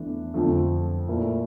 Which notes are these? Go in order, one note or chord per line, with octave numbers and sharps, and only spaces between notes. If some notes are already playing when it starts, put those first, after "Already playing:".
Already playing: E2 E3 A3 D4
F2 D3 F3 A3
A#2 A3 E4 A#4